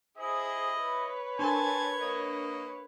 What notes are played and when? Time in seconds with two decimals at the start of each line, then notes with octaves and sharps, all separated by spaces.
0.18 E4 G#4 C5 D#5
0.80 B4 C#5
1.39 D4 A#4 G#5 A5 C6 G#6
2.00 A#3 D#5